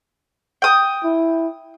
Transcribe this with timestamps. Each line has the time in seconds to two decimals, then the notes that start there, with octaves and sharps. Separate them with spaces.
0.62 G5 D#6
1.04 E4